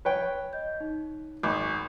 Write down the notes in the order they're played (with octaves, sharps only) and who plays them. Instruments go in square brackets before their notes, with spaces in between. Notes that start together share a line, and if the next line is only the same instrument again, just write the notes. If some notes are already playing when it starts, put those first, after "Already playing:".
[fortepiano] B4 C#5 G5
[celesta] D#5 G6
D#4
[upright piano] G#1 [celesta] G#5 B5 C#6 [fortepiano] D6